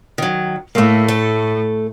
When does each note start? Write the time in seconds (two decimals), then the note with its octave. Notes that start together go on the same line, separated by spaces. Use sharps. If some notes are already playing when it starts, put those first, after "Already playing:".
0.18 D#3 F#3
0.75 A2 A3 A#3
1.08 A3 A4